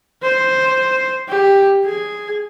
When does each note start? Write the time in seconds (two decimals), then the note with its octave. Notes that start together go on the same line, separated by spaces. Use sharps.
0.23 C5
1.29 G4
1.85 G#4